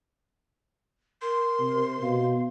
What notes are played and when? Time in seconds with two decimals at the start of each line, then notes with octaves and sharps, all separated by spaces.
1.22 A#4 C6
1.60 C3
2.02 B2 F5